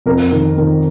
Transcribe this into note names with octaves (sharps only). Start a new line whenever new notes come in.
F2 A#4
D#3
D#3